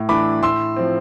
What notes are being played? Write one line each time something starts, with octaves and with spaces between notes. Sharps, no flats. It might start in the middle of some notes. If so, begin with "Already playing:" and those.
Already playing: A2
E3 A3 D4 B5 D6
A2 C6 E6
F3 C4